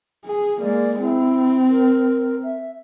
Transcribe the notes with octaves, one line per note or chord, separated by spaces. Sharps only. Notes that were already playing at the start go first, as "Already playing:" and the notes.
G#4
G#3 A#3 D5
C4 E4
A#4
E5